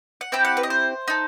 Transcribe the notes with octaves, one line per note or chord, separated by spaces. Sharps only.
F#5
C4 E4 G4 G5
F#5
B4
D#5
C5
D#4 A4